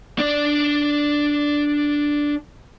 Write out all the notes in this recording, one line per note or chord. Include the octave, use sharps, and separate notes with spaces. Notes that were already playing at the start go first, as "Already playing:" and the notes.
D4 D5